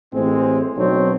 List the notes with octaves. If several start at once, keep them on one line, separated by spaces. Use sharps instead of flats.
A1 A2 G#3 C4
B1 F#3 C4 D4 D#4 C#5